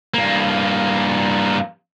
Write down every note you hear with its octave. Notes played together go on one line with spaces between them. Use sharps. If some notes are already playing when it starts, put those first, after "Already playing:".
G2 A#3